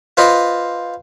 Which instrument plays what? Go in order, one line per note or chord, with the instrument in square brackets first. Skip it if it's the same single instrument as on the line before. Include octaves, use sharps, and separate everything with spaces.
[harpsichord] F4 B4 C5 D#5